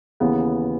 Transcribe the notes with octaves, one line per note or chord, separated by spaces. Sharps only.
D#2 C#3 E3 B3